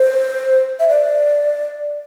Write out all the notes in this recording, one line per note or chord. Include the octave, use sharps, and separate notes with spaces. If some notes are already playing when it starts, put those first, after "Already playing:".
Already playing: C5
E5
D5